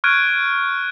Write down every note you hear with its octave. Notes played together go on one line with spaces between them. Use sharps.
C#6 F6 F#6 G#6 D7 D#7